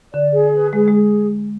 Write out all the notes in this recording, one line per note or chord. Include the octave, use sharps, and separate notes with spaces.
D3 D5
G#4
B4
G#3 G#4
G#3
G#4